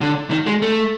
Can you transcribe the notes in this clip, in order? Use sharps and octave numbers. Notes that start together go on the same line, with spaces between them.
D3
D#3
G#3
A3